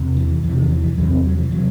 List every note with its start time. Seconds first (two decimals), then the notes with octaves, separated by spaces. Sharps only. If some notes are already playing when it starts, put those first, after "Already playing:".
Already playing: E2 C3
0.17 E3
0.43 E2 C3 E3
0.58 D#3
0.70 E3
0.83 E3
0.97 E2 C3 F#3
1.10 C4
1.24 F#3
1.38 E3
1.51 C3 F#3